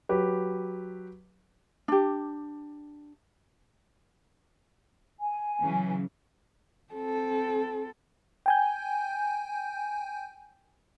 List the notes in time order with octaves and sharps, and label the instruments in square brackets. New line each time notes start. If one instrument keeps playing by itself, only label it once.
[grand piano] F#3 G4 B4
[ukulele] D4 G4
[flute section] G#5
[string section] C#3 E3 F#3
[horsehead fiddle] C4 A4
[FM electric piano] G5 G#5 G6